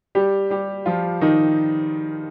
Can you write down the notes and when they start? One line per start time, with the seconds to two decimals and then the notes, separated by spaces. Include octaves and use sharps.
0.15 G3 G4
0.50 G3 G4
0.86 F3 F4
1.21 D#3 D#4